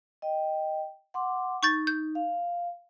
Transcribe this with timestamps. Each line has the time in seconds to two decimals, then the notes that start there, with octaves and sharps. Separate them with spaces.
0.22 D#5 G5
1.14 F#5 C6 D6
1.63 D#4 C#6 G6 A6
1.87 G6
2.15 F5